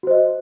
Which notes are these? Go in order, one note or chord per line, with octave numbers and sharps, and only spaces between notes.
F#4 C5 D#5